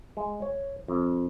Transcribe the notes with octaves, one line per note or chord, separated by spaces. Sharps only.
G#3
C#5
F2